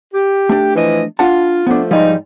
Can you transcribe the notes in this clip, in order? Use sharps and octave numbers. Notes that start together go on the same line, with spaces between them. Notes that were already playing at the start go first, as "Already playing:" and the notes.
G4
A3 D4
E3 F3 D#5
D4 F4 F#5 A5
F3 A3 B3 D4
G#2 F3 G3 G#3 D#4